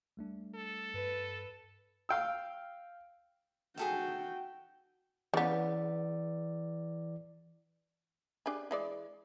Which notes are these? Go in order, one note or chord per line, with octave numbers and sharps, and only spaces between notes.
G3 A3 D4
A4
G2 B4
F5 G5 E6
F#4 G#4 A4 E5 G5
C#3 E3 B3 D5
D4 G4 G#4
E3 G#3 D5